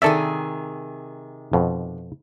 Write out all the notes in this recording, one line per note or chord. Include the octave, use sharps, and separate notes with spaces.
C3 D#3 G#4 A4 D5 E5
F2 B2